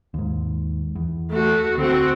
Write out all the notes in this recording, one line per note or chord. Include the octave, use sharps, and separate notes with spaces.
D#2 G#2
E2
A3 F#4
D2 C4 F#4